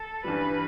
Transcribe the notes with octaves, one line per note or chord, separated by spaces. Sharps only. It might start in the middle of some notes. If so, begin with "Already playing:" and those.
Already playing: A4
G2 E3 G3 B4